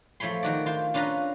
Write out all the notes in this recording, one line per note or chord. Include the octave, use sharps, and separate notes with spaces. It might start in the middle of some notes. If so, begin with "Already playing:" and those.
F3 A3 C#5 B5 C6
D#3 F#4 D5
F4 C5
C#4 D4 F4 B4 A#5